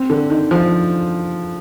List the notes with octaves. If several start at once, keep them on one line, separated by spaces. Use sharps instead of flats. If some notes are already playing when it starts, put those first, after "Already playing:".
Already playing: C4
D3
D#3
F3